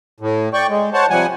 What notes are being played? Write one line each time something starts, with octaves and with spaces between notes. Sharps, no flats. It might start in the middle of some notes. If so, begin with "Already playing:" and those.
A2
D5 G5 C#6
G#3
C5 C#5 F#5 A5
C3 F3 G3 F#5 G#5